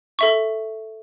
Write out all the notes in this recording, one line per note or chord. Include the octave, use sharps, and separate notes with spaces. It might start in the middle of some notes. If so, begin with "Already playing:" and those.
A4 E5 C#6